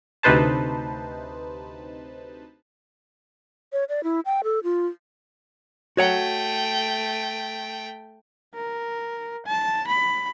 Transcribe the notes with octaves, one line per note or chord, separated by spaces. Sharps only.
D2 C3 D#4 B4 C5 A5
C#5
D5
E4
G5
A4
F4
A3 F#4 C#5 F#5 G5
A#4
A5
B5